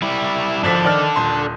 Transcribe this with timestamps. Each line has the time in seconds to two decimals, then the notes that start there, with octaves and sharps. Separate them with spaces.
0.02 G3 E4
0.63 G#1 F3 D4 A4 B6
0.85 D#3 D5 F6
1.16 D#1 C6